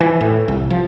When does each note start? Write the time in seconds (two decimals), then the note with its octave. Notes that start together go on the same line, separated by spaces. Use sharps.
0.01 E3
0.21 A2
0.48 C2
0.70 F3